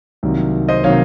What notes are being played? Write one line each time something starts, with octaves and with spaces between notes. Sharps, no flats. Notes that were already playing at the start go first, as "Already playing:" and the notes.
C2 C3 D#3 F#3 A#3
C5 D#5
C3 D#3 F#3 A#3 C#5 F5